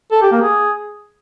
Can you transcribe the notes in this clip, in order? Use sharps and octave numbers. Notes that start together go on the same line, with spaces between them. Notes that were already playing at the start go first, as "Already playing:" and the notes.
A4
G4
A#3
G#4